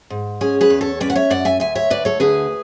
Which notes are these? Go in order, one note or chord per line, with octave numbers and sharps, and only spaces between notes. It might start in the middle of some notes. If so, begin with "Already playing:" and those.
G#2
C#4 G#4
G#4 B4
E2
A4 C#5
C#4 B4 D5
F#5
C#5 E5
F#2 D5 F#5
E5 G#5
D2 E5 G#5
C#5 E5
D2 B4 D5
A4 C#5
D3 G#4 B4